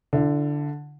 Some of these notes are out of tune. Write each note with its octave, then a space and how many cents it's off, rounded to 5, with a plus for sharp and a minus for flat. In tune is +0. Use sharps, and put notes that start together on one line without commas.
D3 +0 E4 +40